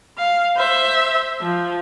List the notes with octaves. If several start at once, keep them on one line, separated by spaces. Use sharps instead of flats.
F5
C5 E5
F3